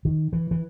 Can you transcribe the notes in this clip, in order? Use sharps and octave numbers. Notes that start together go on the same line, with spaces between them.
D#3
E3
E3